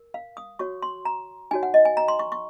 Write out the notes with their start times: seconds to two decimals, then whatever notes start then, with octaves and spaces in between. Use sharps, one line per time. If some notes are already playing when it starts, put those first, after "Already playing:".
Already playing: A#4
0.14 F5
0.37 D#6
0.59 F#4 C#5 C#6
0.82 C6
1.05 A#5
1.51 D#4 F#4 C#5 G#5
1.63 F#5
1.74 D#5
1.85 G#5
1.97 A#5
2.08 C6
2.19 C#6
2.32 C#6